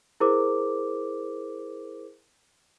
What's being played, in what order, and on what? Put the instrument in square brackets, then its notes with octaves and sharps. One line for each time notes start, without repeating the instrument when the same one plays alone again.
[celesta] E4 G#4 A#4 C5 D6